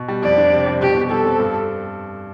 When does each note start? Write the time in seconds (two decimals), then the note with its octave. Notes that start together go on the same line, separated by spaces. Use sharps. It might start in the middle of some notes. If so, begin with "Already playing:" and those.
Already playing: B2
0.08 G3
0.23 F2 D5
0.37 D4
0.52 C3
0.67 G3
0.81 B2 G4
0.95 B2
1.10 G3 A4
1.26 C4
1.40 G2